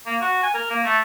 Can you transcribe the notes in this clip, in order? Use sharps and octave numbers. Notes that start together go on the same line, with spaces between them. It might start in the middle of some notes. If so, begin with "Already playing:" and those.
A#3
F#4
G#5
A#4
A#3
A3